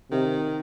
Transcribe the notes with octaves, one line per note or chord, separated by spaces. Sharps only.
C3 D#3